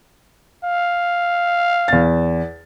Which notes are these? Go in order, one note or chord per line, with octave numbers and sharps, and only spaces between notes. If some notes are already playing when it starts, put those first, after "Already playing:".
F5
E2 A6